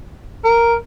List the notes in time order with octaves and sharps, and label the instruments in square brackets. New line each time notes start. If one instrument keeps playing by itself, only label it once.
[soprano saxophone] A#4